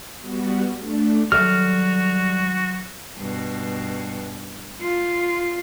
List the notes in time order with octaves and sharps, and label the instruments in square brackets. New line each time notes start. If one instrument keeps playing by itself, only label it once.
[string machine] G3 B3 F#4
A3 D4
[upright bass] D#3 F#3 [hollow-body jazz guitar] G3 A4 E5 [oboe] F#4 [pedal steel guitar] F6
[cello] G2 B2
F4